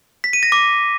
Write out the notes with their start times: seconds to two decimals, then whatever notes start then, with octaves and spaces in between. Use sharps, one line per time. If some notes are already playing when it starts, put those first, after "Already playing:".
0.24 B6
0.33 D#7
0.43 A#6
0.52 D6